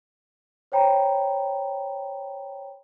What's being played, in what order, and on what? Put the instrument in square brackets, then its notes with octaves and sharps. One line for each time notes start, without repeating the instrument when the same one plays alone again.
[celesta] C5 C#5 G5 A#5 B5